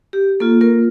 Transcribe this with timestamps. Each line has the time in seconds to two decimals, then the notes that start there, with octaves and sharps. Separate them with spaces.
0.13 G4
0.40 A#3 F4 A4
0.61 A#3 A#4